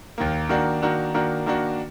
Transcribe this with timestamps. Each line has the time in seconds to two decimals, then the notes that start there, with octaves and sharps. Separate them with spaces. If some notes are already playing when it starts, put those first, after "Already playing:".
0.18 D#2 D#3 A#3
0.49 D#3 A#3 D4 F#4
0.82 D#3 A#3 D4 F#4
1.14 D#3 A#3 D4 F#4
1.46 D#3 A#3 D4 F#4